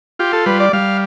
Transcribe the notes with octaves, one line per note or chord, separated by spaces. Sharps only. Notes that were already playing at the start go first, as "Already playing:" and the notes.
F4 G4
A4
G3 B4
D5
G3 F5